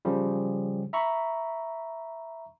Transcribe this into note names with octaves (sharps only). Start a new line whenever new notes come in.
C#3 F3 G3
E5 A#5 B5 C#6